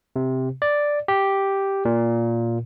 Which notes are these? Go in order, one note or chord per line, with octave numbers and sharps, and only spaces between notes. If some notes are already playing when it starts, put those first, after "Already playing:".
C3
D5
G4
A#2